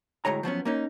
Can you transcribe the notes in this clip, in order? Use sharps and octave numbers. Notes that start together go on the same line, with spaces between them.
D2 A2 G#3 C#5 A#5
F3 F#3 B3 C#4
A#3 C#4 D#4